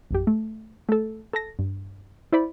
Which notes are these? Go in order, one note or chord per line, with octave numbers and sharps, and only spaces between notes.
A#1 F#2 G4
A3
A3 A4
A4 A5 A#6
G2
E4 C5 D5 B5